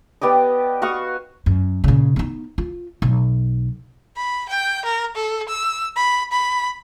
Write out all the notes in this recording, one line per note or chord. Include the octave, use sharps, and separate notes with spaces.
B3 G4 D5 D#5
F#4 F5 C#6 D#6
F#2
A#2 C#3
B3 D#4
F4
B1
B5
G5
A#4
A4
E6
B5
B5